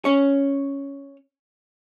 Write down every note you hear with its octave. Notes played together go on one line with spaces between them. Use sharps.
C#4 C#5